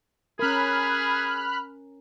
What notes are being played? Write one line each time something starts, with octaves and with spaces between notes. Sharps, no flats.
C#4 G#4 A#4 B5 F6 F#6